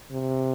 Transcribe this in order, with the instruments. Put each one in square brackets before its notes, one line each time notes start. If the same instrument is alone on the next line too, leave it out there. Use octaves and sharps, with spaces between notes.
[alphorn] C3